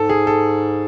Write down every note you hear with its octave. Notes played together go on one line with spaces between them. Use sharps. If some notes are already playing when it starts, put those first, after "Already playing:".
Already playing: G#2 A4
G#4
A4